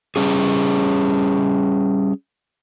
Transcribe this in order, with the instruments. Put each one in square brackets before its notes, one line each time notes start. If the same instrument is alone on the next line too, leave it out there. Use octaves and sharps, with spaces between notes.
[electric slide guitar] G3 C#4 G#4